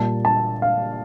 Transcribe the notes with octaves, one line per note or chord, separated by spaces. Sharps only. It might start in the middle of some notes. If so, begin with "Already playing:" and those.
Already playing: A#2 G3 A#3 A5
A5
F5